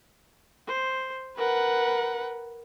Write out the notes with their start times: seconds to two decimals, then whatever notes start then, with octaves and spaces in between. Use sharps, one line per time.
0.67 C5
1.37 A#4 B4 F#5